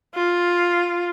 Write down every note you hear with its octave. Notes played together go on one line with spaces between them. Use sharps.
F4